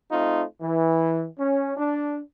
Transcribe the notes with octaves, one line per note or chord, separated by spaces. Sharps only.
A3 C4 D#4 F4
E3
C#4
D4